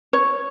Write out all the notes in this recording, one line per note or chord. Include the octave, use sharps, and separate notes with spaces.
C#5